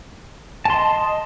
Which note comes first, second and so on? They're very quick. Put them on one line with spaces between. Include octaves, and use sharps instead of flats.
A5 C6 D#5